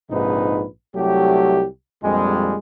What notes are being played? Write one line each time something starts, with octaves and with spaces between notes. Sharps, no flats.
A#1 G#2 C3 D#4 B4
C2 F#3 A3 G4
A#1 F2 G3 G#3